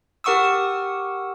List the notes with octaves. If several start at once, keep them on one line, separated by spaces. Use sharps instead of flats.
G4 A#4 F#5 C#6 D#6 E6